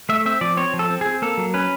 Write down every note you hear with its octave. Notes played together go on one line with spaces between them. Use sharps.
A3 E5
C4 E5
F3 D5
C4 C#5
F3
A4
C4
C4 G#4
A#3 A4
F#3
C#4 B4